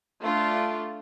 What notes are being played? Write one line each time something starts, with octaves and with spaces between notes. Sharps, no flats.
A3 D4 F4